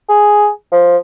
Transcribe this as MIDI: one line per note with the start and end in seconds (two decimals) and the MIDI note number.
0.09 0.49 68
0.72 0.97 53